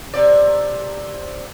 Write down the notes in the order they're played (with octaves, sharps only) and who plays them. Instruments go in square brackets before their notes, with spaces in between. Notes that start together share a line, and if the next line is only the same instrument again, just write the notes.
[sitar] C3 D5